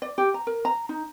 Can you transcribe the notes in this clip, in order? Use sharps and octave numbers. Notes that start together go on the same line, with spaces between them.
D5
G4
A#5
A#4
A#5
D#4